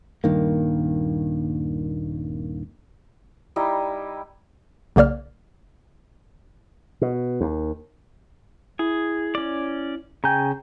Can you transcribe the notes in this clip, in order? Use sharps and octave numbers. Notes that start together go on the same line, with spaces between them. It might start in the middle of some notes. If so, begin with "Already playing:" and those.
D#1 G2 D#3 A#3
G3 D#4 E4 D#5
B1 C#3 A#3 D5 F6
B2
D#2
E4 G#4
C#4 D5
C#3 G5 G#5 A#5 G6